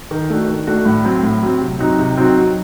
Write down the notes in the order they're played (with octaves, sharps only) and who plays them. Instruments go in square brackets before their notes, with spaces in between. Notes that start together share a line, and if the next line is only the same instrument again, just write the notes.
[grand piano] D#3
A3 D4 F#4
D#3
A3 D4 F#4
A2
F#3 C4
A2
F#3 C4
C3
F#3 C4 D#4 F#4
C3
F#3 C4 D#4 F#4
F#3